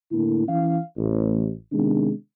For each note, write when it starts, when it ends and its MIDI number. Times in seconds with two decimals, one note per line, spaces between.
0.12 0.45 45
0.12 0.45 50
0.12 0.45 58
0.12 0.45 64
0.48 0.78 52
0.48 0.78 61
0.48 0.78 77
0.97 1.50 33
1.72 2.10 48
1.72 2.10 51
1.72 2.10 56
1.72 2.10 59
1.72 2.10 62